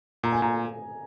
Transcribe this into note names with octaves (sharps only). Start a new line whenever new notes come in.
A#2 A#5
G#5
A#2 A#5